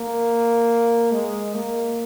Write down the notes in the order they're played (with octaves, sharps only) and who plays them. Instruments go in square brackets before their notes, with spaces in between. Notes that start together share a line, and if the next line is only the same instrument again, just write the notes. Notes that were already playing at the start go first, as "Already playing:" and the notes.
Already playing: [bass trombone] A#3
G#3
A#3